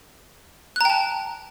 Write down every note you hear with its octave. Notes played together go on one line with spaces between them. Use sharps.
G5 A5 A#5 F#6